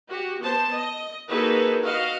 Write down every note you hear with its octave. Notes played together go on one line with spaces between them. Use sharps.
F#4 G4
B3 C5 A5
D#5
A#3 D#4 F#4 G#4 A4 B4
F#4 B4 D#5 F5